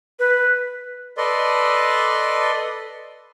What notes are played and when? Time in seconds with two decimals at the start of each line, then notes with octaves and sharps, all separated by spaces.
0.19 B4
1.17 A4 B4 D5 D#5 C6